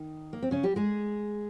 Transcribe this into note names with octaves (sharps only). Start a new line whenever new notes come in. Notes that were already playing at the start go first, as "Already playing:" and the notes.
Already playing: D#3 D#4
A#3
C4
C#3 C#4
G3 G4
G#3 G#4